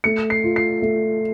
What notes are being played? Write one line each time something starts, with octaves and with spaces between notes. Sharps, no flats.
A3 C#7
C7
F4
C7
A3